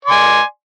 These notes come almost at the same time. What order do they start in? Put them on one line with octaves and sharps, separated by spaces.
D5 C6 G#5